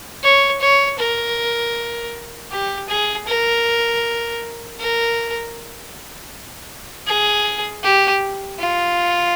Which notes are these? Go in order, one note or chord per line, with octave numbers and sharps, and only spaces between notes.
C#5
C#5
A#4
G4
G#4
A#4
A#4
G#4
G4
F4